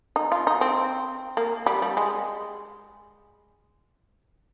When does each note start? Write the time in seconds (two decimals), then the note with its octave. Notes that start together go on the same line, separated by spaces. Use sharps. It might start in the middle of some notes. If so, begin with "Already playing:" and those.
0.16 D#4
0.32 F4
0.47 D#4
0.61 C4
1.37 A#3
1.66 G3
1.82 G3
1.97 G#3